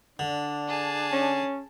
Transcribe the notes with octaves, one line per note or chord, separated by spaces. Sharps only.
D3 D4
G#4 A5
C#4